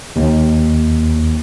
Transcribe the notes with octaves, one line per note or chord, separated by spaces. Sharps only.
D#2